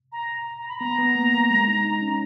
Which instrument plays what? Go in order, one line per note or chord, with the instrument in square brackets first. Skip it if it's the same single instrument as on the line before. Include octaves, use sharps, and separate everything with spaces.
[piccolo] A#5
A#5
B5
[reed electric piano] B3 [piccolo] A#5
[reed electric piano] B3
A#3
A#3
G#3
D#4
D#4
C#4